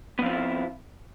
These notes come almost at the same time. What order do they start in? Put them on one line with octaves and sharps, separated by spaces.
B3 F3 C4 F4 E4